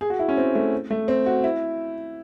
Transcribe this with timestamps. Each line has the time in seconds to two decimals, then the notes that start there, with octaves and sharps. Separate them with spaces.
0.01 G#4
0.10 F#4
0.19 E4
0.29 C#4
0.37 C4
0.55 A3
0.91 A3
1.08 C4
1.26 F#4
1.44 E4